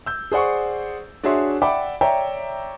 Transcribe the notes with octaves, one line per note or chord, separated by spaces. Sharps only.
E6 G6
G#4 C5 D5 F#5 C#6
D4 F#4 G#4 C#5 E5 C6
D5 E5 F#5 G5 B5 D6
C#5 D5 E5 G5 A#5